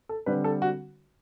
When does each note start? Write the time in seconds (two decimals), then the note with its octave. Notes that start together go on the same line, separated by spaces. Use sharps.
0.09 A4
0.26 D3 G3 C4 B4
0.44 A4
0.62 F#4